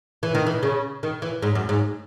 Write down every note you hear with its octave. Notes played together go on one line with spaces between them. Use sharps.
E3
D#3
E3
C#3
D#3
E3
G#2
F#2
G#2